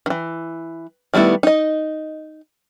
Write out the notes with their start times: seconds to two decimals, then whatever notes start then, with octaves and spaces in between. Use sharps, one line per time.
0.06 D#3 E3
1.14 D#3 G3 A3 B3 E4
1.43 D#4 D#5